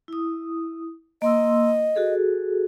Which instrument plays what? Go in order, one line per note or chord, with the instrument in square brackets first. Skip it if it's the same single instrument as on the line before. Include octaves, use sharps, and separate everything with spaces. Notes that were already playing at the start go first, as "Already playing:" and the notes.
[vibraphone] E4 D#6
[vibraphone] A#3 C6 E6 [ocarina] D#5
[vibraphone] F#4 G#4 A4